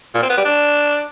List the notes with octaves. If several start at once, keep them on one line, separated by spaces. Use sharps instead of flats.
A#2
C4
B3
G3
D4